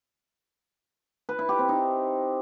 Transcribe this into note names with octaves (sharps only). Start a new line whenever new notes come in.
B4
E4
G4
C4
D#4